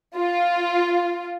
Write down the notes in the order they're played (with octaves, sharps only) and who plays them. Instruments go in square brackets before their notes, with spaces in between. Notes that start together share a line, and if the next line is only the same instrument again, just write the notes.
[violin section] F4